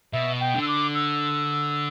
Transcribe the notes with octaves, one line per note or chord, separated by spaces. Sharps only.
B2 E5
G5
D3
E6
D6
E6